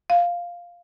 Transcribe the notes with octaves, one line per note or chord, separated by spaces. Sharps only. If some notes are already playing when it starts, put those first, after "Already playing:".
F5